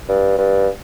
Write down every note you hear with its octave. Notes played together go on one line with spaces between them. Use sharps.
G2
G2